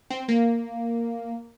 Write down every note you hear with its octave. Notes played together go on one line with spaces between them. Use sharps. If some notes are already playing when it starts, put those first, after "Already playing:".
C4
A#3